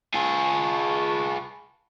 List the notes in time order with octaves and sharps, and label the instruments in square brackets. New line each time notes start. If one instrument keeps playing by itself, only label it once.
[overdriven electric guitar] F4 G#4 [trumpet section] B4 A5 C#6